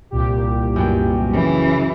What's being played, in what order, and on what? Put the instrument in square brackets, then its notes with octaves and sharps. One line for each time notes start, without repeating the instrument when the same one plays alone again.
[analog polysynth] C2 A#2 G4
[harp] F#2 B3 G5
[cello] C#3 E3